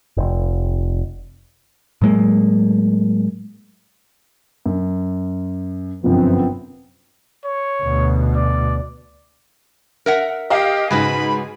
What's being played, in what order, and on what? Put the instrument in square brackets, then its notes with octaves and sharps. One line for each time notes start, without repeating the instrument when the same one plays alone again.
[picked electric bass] F1
A2 F#3 G#3 A#3
[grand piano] F#2
[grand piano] G1 F#2 C3 [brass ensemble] F3 B3 C4
[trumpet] C#5
[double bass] D2 B2
[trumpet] D5
[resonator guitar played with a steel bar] A#4 E5 F#5
[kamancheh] G4 [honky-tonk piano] D#5 F5 F6
[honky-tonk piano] G#2 [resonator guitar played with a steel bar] C#3 F#4 B4 [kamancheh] G#4 [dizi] B5